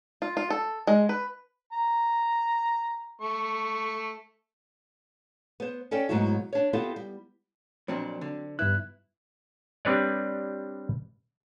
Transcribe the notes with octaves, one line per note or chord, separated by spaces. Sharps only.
F4
F4
A4
G#3
B4
A#5
A3 C#6
B3 C5
C#4 A4 C#5 D5 G5
G#2 B2 F#3 A3 E4 F#4
D4 C#5
B3 C4 E4 F4 G4 A4
G3
F2 A#2 F#3 C4 D4 C#7
D3
G2 B3 E4 F#6
G3 C4 D4 B4 C#5 D5